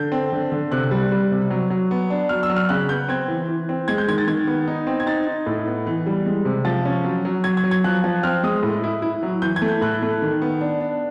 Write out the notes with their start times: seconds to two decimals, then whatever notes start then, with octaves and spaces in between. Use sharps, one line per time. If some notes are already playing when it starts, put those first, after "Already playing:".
Already playing: D3 G6
0.12 C4
0.32 D3
0.52 D3
0.72 C3 F#6
0.91 G3
1.12 G3
1.31 C3
1.50 F#3
1.70 F#3
1.91 B3
2.10 D4
2.29 F#3 F6
2.43 E6
2.50 F#3
2.56 F6
2.69 C#3 F#6
2.89 B3 G6
3.09 C4 G#6
3.28 E3
3.48 E3
3.69 C4
3.88 G#3 G#6
3.98 G6
4.08 D#3 G#6
4.18 A6
4.27 D#3 G#6
4.47 B3
4.68 D#4
4.87 C4
5.00 G#6
5.06 D#4 A6
5.27 D#4
5.46 A2
5.66 B3
5.87 E3
6.06 G3
6.26 G#3
6.45 C3
6.65 F3 A6
6.85 C#4
7.04 F#3
7.25 F#3
7.44 F#3 G#6
7.57 G#6
7.64 F#3
7.71 G#6
7.84 F3 F#6
8.04 F3
8.23 C4 F6
8.44 G#3 D#6
8.63 A2
8.84 E4
9.02 E4
9.23 F#3
9.42 E3 G6
9.56 G#6
9.62 A3
9.68 G6
9.81 A2 F#6
10.02 A3
10.22 D#3
10.42 B3
10.61 D4
10.80 D4